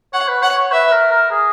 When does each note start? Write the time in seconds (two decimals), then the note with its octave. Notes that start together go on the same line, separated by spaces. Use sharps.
0.13 C#5 F#5
0.28 B4
0.42 C#5 F#5
0.57 C#5
0.72 B4 E5
0.91 A#4
1.11 A#4
1.31 G#4